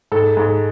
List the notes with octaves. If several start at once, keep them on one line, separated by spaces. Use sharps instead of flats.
G#2 A4
G#2